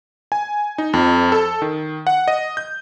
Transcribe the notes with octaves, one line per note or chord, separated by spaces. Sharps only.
G#5
D#4
F2
A4
D#3
F#5
D#5
G6